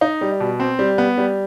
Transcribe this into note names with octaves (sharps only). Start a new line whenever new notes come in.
D#4
G3
B2
C4
G3
B3
G3